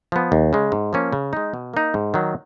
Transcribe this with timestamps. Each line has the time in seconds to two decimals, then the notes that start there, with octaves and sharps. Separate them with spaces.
0.12 F3 B3
0.32 D#2
0.53 C#3 G#3
0.72 G#2
0.93 F3 A#3 C#4
1.13 C#3
1.33 G#3 D#4
1.54 B2
1.74 A#3 D#4
1.94 G#2
2.14 D#3 F#3